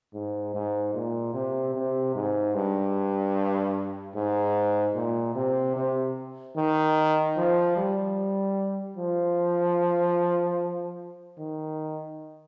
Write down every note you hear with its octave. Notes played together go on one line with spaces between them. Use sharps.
G#2
G#2
A#2
C3
C3
G#2
G2
G#2
A#2
C3
C3
D#3
F3
G3
F3
D#3